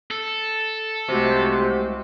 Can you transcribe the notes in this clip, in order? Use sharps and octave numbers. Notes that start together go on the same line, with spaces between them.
A4
C2 C3 G#3 A3 F#4 G4 C5